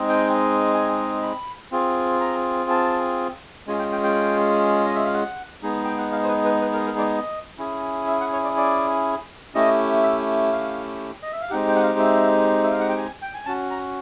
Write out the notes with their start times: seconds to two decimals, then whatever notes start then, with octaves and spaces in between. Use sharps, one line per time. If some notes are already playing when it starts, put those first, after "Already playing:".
Already playing: G#3 C4 D#4 G#4
0.09 G5
0.74 G#5
1.23 B5
1.71 C4 F4 G#4
2.20 A#5
2.70 A5
3.67 G#3 C#4 F4 G#4 G#5
3.79 G5
3.92 G5
4.03 G5
4.86 D#5
4.95 E5
5.05 F5
5.14 F#5
5.63 G#3 B3 D#4 G#4
5.84 G5
5.98 F#5
6.12 F5
6.23 C5
6.28 B4
6.45 B4
6.62 B4
6.73 A#4
6.86 A#4
6.98 D5
7.10 D#5
7.58 C#4 E4 G#4
8.07 E5
8.21 F#5
8.33 C#5
8.44 D5
8.57 D5
9.54 A3 C#4 E4 G4 D#5
10.03 E5
10.53 F5
11.23 D#5
11.33 E5
11.41 F5
11.50 G#3 C4 D#4 G4 F#5
11.67 G5
11.76 F#5
11.83 F5
11.99 E5
12.64 E5
12.71 F5
12.80 F#5
12.89 G5
12.97 G#5
13.22 G5
13.34 G#5
13.46 C#4 F#4 A5
13.71 A#5